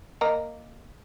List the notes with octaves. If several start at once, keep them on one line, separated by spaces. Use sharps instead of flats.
A#3 A#4 D#5